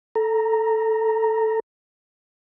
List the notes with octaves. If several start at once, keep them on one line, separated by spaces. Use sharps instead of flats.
A4 A#5